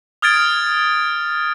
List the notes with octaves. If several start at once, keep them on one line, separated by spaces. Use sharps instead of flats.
D#6 F6 G#6 A6 D7